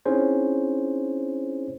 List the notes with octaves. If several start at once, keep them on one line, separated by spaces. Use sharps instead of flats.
C4 C#4 D#4 E4 G#4 C5